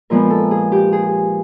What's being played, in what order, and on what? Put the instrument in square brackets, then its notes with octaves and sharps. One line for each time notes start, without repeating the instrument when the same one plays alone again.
[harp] A#2 F3 G#3 B3 A#4
A4
G#4
G4
G#4